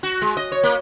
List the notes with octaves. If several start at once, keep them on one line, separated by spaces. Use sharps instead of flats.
F#4
G#3
D#5
C#5
A#3